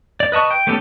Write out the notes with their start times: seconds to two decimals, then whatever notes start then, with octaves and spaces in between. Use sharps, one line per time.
0.20 D5
0.32 B4 D#5 A5 C#6
0.50 G5
0.67 A3 B3 C#4 G4 A4